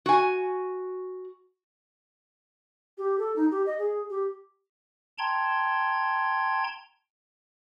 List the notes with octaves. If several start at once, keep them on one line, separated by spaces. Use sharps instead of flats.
F#4 G#5
G4
A4
D#4
G4
D#5
G#4
G4
G5 A5 A#5 C6 G#6